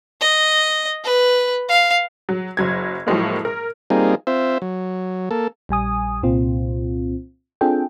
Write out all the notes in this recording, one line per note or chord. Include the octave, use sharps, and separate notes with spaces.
D#5
B4
F5
F#3
F#1 F#3 G#6
A2 F3 F#3 G#3 A#3
A#4
G3 A#3 C4 D#4 F4 G#4
C4 F4 C5 E5
F#3
A#3 A4
A#1 G3 G#5 D#6
C2 A#2 C4 F4
C4 D4 F4 G#4 A4 G5